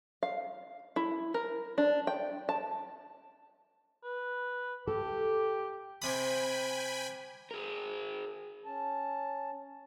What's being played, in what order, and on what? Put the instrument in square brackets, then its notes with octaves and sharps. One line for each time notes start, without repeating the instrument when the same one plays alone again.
[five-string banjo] F5
E4
A#4
D4
G5
A5
[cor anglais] B4
[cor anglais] G4 [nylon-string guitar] A4
[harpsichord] C3 D#6 [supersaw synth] G5 G#5 B5
[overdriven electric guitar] G#4 A#4
[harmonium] C#4 A5